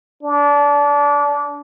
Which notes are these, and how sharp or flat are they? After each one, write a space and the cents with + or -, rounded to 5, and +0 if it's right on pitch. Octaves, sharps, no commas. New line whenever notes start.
D4 -25